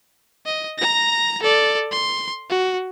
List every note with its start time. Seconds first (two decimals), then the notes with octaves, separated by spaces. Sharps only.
0.46 D#5
0.78 A#5 A#6
1.42 A4 D5
1.92 C6
2.50 F#4